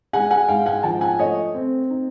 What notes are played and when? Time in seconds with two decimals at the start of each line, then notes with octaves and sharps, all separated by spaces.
0.13 G#3 F#5 G#5
0.31 F#5 G#5
0.48 G#2 F5 G5
0.66 F#5 G#5
0.83 F3 G5 A5
1.01 F#5 G#5
1.19 A3 C#5 D#5
1.54 C4
1.90 D#4